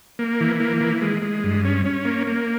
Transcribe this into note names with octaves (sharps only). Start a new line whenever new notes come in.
A#3
E3
A#3
E3
G#3
G#3
G2
C#4
C#4
A#3
A#3